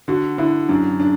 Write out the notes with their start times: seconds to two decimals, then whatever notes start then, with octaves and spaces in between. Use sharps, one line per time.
0.08 D3 F#4
0.38 D3 E4
0.69 F#2 D4
1.00 D4